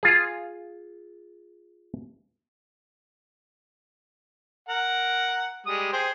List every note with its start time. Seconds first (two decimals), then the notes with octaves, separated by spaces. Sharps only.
0.03 F4 G#4
4.69 A#4 F#5
5.66 G3 G#3 D#6
5.93 G#4 C5 G5